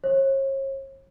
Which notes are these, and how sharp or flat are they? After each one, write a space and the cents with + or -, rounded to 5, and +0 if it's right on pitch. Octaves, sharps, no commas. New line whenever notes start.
C#5 -40